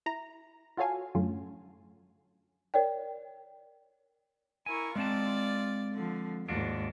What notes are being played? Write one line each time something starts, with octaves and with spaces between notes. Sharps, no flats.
E4 A#5
F4 F#4 A4 C#5 F5 G#5
F#2 A2 D3 F#3 C#4 F4
A#4 C#5 D5 G5
E4 A#4 G#5 C#6
G#3 C4 F4 D5 A5 A6
D3 F3
D#2 G#2 D4 F4 F#4